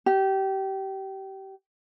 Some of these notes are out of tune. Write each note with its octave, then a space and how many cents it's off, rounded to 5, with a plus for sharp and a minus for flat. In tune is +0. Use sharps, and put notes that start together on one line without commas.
G4 -25